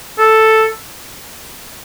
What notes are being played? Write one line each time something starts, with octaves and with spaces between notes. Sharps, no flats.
A4